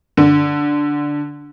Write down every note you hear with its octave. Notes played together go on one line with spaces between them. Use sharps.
D3